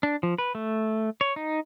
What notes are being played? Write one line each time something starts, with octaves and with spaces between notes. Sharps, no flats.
D4
F3
B4
A3
C#5
D#4